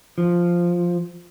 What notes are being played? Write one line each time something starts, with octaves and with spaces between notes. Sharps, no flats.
F3